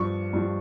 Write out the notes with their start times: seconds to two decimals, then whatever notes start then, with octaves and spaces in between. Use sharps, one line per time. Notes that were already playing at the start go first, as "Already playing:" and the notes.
Already playing: G2 F3 C#6
0.33 G2 F3